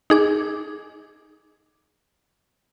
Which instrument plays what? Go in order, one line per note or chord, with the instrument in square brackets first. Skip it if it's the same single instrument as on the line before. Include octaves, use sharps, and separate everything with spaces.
[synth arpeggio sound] D#4 G#4 D6